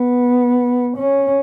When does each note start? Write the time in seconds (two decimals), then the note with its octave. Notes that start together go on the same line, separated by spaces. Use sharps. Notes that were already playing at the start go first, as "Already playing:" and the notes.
Already playing: B3
0.98 C#4